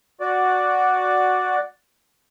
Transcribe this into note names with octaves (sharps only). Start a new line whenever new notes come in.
F#4 D5